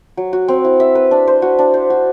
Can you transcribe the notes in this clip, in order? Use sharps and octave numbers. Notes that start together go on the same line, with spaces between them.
F#3
F#4
C4
E4
E5
B4
D4
C5
F#4
D4
C5
F#4